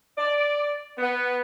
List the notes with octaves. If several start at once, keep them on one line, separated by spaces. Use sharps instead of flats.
D5
B3